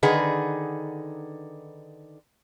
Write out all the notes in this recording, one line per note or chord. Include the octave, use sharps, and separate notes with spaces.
D3 D#3 D#4 G#4 B4 F#5